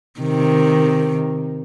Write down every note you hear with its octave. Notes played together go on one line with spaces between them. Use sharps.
C3 D#3